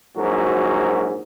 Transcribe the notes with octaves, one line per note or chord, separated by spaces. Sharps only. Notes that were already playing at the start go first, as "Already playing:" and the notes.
A#1 G#2 F#3 F#4 A#4